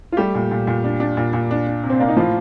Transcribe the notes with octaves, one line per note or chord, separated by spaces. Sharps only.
F4
G3 A3 G4
A#2
A#2
A#2
D4
D4
A#2
A#2
D4
D4
C3
C4
A#3 D4
D#4
A2 F3 F4